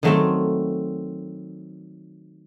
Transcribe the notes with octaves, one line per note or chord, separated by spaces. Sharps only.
D#3 F#3 A3 C4